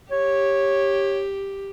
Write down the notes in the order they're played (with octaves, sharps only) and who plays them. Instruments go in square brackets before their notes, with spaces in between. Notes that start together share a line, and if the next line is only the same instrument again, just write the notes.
[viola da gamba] G4 [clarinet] C#5